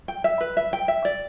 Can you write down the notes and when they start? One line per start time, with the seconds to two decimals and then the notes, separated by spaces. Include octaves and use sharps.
0.08 G5
0.24 E5
0.41 B4
0.57 E5
0.73 G5
0.88 E5
1.05 D5